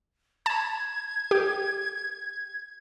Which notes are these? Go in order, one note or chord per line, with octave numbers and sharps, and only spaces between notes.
A5 G#6
G4